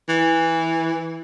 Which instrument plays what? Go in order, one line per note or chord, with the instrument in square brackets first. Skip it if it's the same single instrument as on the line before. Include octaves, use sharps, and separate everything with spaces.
[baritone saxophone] E3